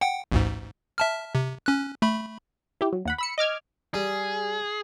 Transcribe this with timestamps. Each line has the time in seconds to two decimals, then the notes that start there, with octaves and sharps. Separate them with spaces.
0.01 F#5 G5
0.32 A1 D2 G#2
0.98 E5 A5 F6
1.35 C3
1.66 C#4 F#6
2.02 A3 B5
2.81 E4 G4
2.93 F#3
3.05 D#2 F#5 B5
3.18 B5 E6 C#7
3.38 D#5 D6 F6 G#6
3.94 G3 G#4